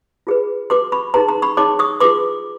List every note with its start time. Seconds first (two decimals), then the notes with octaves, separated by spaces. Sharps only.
0.27 F4 G#4 B4
0.70 F#4 B4 C6 D6
0.92 B5 C#6
1.14 D#4 G#4 B4 A#5 C6
1.29 A#5 C6
1.42 B5 C#6
1.57 D#4 G#4 C#5 C6 D6
1.79 C#6 D#6
2.00 F4 G#4 B4 C6 D6